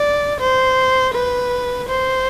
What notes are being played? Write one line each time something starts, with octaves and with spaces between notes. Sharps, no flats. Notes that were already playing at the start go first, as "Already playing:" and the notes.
Already playing: D5
C5
B4
C5